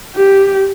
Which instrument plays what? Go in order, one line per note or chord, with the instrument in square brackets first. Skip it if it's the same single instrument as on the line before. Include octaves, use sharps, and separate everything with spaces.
[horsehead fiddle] G4